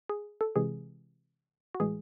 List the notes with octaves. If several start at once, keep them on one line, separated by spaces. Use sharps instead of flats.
G#4
A4
C3 E3 G#3 G#4
F#4
A2 E3 G#3 G#4